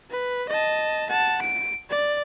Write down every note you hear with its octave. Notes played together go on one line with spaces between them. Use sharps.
B4
D#5 A5
F#5 A5
D7
D5